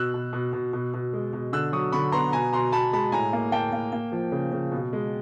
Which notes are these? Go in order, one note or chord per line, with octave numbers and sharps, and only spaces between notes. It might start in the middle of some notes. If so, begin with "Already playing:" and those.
Already playing: B2 E6 F#6
B2
B2
B2
B2
B2
G#3
B2
D3 E6 F#6
F#3 C#6 D#6
D3 B5 C#6
B3 A#5 C6
B2 G#5 A#5
B2 A#5 C6
B2 A5 B5
G#3 A5 B5
A2 G#5 A#5
A#3
A#3 G5 A5
A#3
A#3
F3
C#3
C#3
B2
G#3